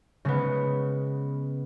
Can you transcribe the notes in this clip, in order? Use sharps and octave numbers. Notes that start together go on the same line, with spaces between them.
C#3 G#3 B3